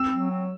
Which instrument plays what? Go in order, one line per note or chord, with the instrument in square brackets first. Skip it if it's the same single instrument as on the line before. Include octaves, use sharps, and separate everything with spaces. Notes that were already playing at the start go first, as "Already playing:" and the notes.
Already playing: [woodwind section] C4 [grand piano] E6
[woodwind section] F#3
C4